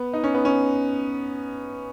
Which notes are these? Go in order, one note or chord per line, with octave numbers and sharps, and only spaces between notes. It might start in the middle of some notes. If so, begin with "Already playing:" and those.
Already playing: B3
D#4
C#4
B3
C#4